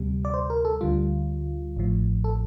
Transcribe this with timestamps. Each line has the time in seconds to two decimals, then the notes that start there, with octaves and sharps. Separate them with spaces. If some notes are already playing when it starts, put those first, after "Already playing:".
Already playing: D2 C3 G3
0.25 D5
0.34 C5
0.50 A#4
0.65 A4
0.81 D2 D3 G3 F4
1.77 A1 A2 F3
2.24 A4